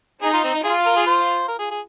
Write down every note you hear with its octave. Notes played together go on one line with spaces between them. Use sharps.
D#4 G#4
F4
C4
D#4
F4 G#4
A#4
G#4
C5
A#4
G#4
G#4